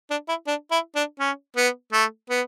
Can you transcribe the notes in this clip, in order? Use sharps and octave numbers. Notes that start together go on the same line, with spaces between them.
D4
E4
D4
E4
D4
C#4
B3
A3
B3